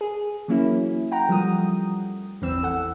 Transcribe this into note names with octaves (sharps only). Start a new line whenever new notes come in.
G#4
E3 F#3 A#3 C#4 E4
F#5 G5 A#5
F3 G3 A3 D#6
G#1 E2 E3 C4 E6
A4 F#5